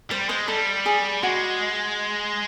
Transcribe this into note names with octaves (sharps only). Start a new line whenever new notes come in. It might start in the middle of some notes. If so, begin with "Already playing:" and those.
G3 C5
G#3 C5
G3 A4
G#4
G#3 F#4